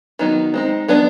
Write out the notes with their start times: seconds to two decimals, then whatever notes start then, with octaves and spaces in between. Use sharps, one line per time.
0.19 D#3 F#3 B3 D#4
0.54 G#3 C4 D#4
0.88 F#3 B3 D4